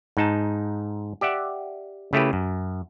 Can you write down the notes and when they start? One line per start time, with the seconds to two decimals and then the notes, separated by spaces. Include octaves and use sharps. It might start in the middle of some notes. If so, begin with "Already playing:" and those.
0.17 G#2 D#4 A5
1.21 G4 D5 E5 F#5
2.13 C#3 A3 E4 G4 B4
2.33 F#2